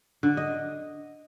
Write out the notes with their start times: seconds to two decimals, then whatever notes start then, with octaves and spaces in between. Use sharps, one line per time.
0.23 D3
0.37 D#5